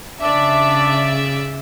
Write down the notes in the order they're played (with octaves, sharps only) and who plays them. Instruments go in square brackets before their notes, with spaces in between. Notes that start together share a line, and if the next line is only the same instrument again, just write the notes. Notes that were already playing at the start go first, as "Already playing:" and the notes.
[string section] C#3 D5 E5 [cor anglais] D4